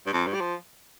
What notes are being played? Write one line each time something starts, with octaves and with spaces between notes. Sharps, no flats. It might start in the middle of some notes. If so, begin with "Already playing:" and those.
G2
F2
G2
G3
F3